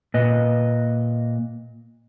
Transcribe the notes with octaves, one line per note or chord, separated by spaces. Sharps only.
A#2 B4 D#5